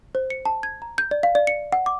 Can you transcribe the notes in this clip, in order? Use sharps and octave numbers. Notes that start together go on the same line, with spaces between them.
C5
C#7
A5
G#6
A#5
G6
D5
F5
D5
C#7
F#5
D6